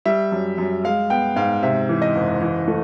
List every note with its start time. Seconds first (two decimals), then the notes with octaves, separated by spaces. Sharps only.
0.06 G3 E5
0.32 F#2
0.58 F#2
0.84 G#3 F5
1.10 B3 G5
1.36 G#2 F5
1.63 C3 E5
1.89 E3
2.02 D#5
2.14 F#1
2.41 E3
2.68 A3